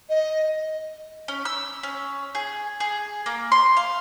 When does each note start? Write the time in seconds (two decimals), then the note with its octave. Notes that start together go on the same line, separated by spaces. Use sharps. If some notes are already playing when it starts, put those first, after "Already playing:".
0.10 D#5
1.28 C#4
1.45 E6
1.83 C#4
2.35 G#4
2.80 G#4
3.26 A#3
3.52 C6
3.77 F5